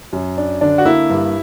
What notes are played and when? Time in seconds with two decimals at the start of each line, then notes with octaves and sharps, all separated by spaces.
0.13 F#2
0.38 D4
0.61 D3 D4
0.78 F#4
0.85 A#3 E4
1.10 G2